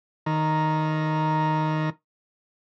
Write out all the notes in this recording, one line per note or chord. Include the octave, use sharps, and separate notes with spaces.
D#3 A#5